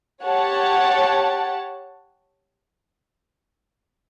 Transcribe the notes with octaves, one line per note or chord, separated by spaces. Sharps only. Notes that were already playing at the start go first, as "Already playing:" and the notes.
G4 C#5 F#5 A5